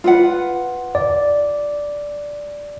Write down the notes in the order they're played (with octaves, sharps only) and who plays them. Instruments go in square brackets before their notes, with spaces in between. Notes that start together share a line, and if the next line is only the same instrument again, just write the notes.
[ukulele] F4 B4 F#5
[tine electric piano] D5